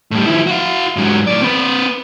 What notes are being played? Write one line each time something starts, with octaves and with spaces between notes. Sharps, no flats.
A2 G3
F3 E4
F#4 F5
G#2 F#3
A2 D5
C4 B4